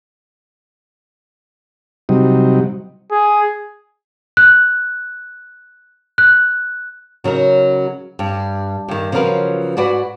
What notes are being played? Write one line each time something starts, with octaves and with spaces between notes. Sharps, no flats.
C3 F#3 G3 D#4
G#4
F#6
F#6
C#3 F#3 D#4 A#4
G2
G2 D#3
C#3 F3 F#3 F#4 A#4 B4
G#2 F#4 B4 D5 F#5